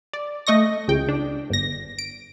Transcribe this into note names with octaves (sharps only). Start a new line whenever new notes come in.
D5
A3 D#5 C#6 A#6
C#2 C#3 G5
D4
G1 A#6
D7